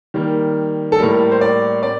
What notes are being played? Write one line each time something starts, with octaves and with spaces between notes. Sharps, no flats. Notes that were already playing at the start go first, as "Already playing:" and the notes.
D#3 G3 A#3
A4
A2 G3 A#3 A#4
C5
D5
C4 D5